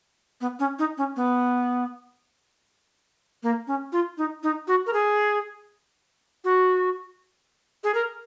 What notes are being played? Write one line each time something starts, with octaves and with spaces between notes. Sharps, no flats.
B3
C#4
D#4
C#4
B3
A#3
C#4
F4
D#4
D#4
F#4
A#4
G#4
F#4
G#4
A#4